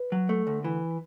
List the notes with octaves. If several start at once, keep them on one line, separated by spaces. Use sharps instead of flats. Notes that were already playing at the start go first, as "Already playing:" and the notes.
Already playing: B4
F#3
A3
D2
E3